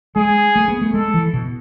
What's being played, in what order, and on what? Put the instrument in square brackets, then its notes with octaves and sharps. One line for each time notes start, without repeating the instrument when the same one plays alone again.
[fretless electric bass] G#3 [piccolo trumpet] G#4
[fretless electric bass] A3
B3
A3
[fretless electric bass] G#3 [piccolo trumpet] A4
[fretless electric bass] E3
B2